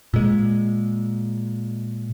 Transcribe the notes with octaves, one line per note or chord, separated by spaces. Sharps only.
A#2 G#3